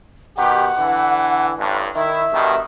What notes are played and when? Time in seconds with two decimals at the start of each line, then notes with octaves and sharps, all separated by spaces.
0.37 B2 D#3 G4 F#5
0.77 D3 E3
1.58 A1 G2
1.95 D#3 E4 E5
2.32 G2 B2 D#3